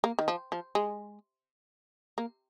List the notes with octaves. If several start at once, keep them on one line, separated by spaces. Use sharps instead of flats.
A#3
D#3
F3
F3
G#3
A#3